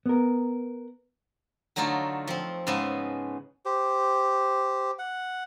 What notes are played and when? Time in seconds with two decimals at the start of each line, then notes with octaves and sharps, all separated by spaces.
0.06 B3 A#4
1.76 D3 F#3 A3 D#4 F4
2.27 F3 C4
2.67 G#2 C#3 G#3 B3 E5 A5
3.65 G4 C5
4.99 F#5